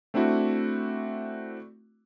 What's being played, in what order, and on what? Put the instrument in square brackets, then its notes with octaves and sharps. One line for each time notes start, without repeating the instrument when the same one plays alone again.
[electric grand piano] A3 C4 D4 E4 F#4